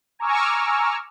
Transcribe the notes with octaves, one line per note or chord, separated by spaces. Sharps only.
G#5 A#5 C#6 D6 E6 F6